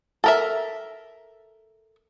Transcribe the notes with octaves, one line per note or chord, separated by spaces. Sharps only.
A4 A#4 E5